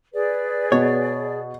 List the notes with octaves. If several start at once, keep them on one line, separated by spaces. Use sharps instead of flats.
G#4 B4 D5
B2 C#5